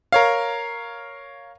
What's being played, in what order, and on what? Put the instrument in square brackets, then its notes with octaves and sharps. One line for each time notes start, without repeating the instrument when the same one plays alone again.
[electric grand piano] A#4 C#5 F5